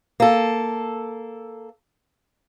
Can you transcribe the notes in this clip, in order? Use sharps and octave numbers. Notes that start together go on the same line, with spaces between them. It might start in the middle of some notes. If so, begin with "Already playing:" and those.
A#3 A4